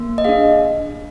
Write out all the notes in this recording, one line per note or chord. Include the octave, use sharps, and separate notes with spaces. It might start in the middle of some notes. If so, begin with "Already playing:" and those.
Already playing: A#3
D#5
D4 G#4 F5